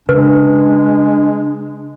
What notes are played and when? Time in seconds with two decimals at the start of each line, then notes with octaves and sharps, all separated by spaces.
0.09 C#3 G#3 D4 B4